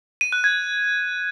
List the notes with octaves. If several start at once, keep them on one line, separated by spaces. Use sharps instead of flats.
D#7
F#6
G#6